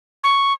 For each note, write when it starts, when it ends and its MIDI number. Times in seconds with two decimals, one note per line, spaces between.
0.24 0.53 85